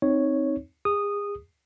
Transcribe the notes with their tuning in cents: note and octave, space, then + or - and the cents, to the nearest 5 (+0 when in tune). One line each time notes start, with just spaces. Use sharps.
C4 +0 D#4 +0 C#5 +0
G#4 -35 D#6 -10